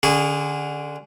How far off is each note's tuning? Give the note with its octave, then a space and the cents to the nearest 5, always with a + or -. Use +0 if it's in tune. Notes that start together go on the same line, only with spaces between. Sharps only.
D3 +15 C#4 +25 G#4 -20